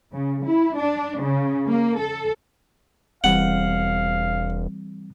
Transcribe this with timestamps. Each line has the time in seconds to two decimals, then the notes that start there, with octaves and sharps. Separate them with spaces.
0.12 C#3
0.44 E4
0.76 D4
1.20 C#3
1.68 A#3
1.99 A4
3.24 E1 E3 G3 C4 F5 F#5